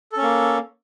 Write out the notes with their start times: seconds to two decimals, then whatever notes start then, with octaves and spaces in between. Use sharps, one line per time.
0.12 A4
0.17 C#4
0.22 A#3